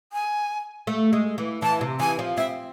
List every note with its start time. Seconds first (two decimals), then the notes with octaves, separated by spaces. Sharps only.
0.13 G#5
0.87 A3
1.13 G#3
1.38 E3
1.62 E3 A5
1.81 C3
2.00 E3 G#5
2.19 F3
2.37 C4 E5